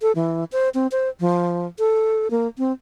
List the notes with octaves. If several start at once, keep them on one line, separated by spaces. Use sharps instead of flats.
A4
E3
C5
C4
C5
F3
A4
A#3
C4